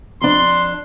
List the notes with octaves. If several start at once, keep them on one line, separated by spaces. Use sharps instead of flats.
F2 D4 C6